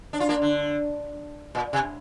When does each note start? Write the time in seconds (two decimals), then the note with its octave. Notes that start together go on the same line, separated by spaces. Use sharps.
0.13 D4
0.20 F4
0.29 A#3 D4
0.42 D3
1.55 A#2
1.73 C3